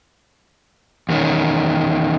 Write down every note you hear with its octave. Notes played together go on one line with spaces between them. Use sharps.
E2 D#3 C#4